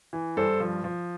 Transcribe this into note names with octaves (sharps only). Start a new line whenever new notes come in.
E3
G2 A4 C5
F3
F3